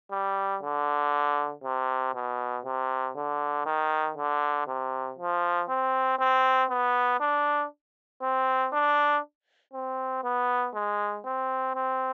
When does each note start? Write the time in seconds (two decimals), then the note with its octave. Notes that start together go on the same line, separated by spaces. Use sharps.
0.12 G3
0.62 D3
1.64 C3
2.15 B2
2.65 C3
3.16 D3
3.66 D#3
4.17 D3
4.67 C3
5.18 F3
5.69 C4
6.19 C4
6.70 B3
7.20 D4
8.22 C4
8.73 D4
9.74 C4
10.24 B3
10.75 G#3
11.25 C4
11.75 C4